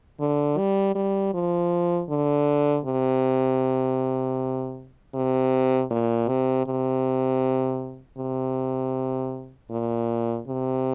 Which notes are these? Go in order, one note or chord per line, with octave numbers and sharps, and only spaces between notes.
D3
G3
G3
F3
D3
C3
C3
A#2
C3
C3
C3
A#2
C3